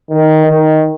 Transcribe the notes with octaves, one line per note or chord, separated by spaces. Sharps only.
D#3
D#3